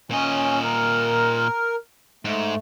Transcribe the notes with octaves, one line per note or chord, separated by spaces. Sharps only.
A#2 C#4 D#5
A#4
G#2 A3